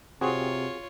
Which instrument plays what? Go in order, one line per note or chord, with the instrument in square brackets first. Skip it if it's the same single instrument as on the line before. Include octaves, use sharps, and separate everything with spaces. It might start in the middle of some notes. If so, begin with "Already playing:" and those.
[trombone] C3 [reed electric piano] C4 F#4 G#4 [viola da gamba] F4 C#5